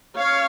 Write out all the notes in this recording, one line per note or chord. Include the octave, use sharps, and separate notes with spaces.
C#4 C#5 F5